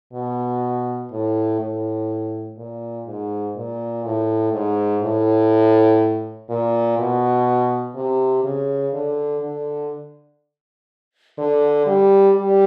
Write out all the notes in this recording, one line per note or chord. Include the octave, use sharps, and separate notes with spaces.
B2
A2
A2
A#2
G#2
A#2
A2
G#2
A2
A#2
B2
C3
C#3
D3
D3
D3
G3
G3